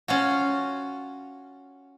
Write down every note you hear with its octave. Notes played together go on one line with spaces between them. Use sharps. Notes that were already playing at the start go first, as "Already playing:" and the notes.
C#4 F4 F#4